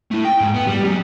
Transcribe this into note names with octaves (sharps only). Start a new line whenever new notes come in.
A3 E4
G5
G#2
B3
G3
F#3 C#4